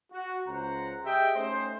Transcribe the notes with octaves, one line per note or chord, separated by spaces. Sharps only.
F#4
C#2 C#4 C5 F#5 A#5
G4 G#4 D#5 E5 G5
A3 C#4 D#4 C5